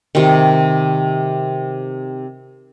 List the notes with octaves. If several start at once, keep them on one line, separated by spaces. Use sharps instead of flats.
C3 D#3